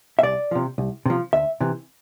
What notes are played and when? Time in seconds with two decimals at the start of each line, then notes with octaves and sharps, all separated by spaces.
0.19 E5
0.23 C2 D5
0.51 C3 F3
0.78 C2
1.06 C3 F3
1.33 D2 E5
1.60 C3 E3